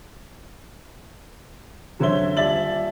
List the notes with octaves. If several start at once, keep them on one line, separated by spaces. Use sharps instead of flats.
F#2 D3 C5 C#5 E5 G7
D#1 D5 E5 A6 F#7